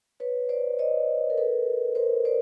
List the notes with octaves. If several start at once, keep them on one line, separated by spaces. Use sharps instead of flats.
B4 C#5
C5 D5
C#5 D#5
A#4
A4 B4
A#4 C5
C5 D5